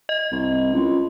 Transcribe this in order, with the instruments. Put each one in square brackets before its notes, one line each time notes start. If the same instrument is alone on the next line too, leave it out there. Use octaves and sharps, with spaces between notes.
[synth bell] D#5
[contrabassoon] C2
C#2